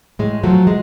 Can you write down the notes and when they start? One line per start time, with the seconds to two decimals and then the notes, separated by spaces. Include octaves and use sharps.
0.19 A2 G#3
0.43 F3 F#3 A3
0.67 G#3